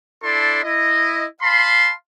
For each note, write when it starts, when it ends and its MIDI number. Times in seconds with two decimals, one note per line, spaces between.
0.23 0.59 62
0.23 0.59 64
0.23 0.59 69
0.23 0.59 74
0.23 0.59 84
0.64 1.25 64
0.64 1.25 75
1.42 1.93 77
1.42 1.93 81
1.42 1.93 83
1.42 1.93 84